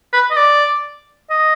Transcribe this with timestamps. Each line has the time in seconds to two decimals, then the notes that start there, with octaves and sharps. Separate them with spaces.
0.13 B4
0.31 D#5
0.36 D5
1.30 D#5